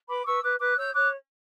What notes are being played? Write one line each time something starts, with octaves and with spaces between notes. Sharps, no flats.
B4 B5 D6
B4 C#6 E6
B4 D6 F#6
B4 D6 F#6
C#5 E6 G6
C#5 D6 F#6